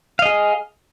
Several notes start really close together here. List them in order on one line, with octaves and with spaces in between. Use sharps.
F5 D#5 G#4